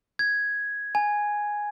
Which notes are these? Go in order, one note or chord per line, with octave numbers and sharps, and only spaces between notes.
G#6
G#5